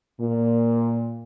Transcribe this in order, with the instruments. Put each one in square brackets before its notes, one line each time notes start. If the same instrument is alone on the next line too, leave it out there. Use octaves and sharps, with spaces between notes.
[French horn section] A#2